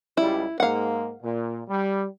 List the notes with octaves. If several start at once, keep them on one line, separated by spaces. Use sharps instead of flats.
C#2 G3 E4
G#2 A#3 F5 F#5
A#2
G3